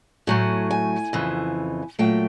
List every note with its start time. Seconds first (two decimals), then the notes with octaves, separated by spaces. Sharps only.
0.27 A2 F#3 A3 G#5
0.71 G#5
1.13 F2 C#3 E3
1.99 A#2 F#3 A3 G5